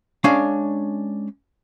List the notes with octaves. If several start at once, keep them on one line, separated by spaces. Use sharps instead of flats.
G#3 C#4 D4 D5 F5